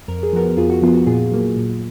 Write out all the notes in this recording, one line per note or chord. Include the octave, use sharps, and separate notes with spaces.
F2 A#4
G#4
F3 B3 F#4 A#4
F2 F4 G#4
F#4
F3 B3 F4
F#4
A#2 F4 G#4
F#3 A#3
A#2